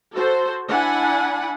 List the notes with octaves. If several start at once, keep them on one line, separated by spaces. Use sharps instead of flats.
F#4 A4 C5
D4 E4 F#5 G#5 B5